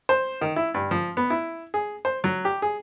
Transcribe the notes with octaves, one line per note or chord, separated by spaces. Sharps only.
C5
D#3
E4
G2
F3
B3
E4
G#4
C5
F#3
G4
G#4